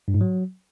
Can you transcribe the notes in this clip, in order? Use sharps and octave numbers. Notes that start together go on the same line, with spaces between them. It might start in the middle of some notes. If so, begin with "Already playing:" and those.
G2
G#2
F#3